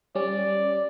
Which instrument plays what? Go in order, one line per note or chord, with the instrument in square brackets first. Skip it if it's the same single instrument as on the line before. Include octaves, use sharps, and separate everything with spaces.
[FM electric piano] G3 C#4 [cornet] D5